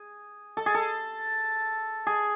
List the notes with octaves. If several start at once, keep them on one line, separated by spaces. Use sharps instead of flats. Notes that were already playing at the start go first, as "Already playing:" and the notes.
Already playing: G#4
A4
G#4
A4
G#4